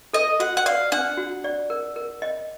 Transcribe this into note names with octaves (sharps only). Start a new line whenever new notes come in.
A4 D#5
F#4 F#5
F#5
D5 F5
D4 F#5
F#4
D5
A#4
A#4
D#5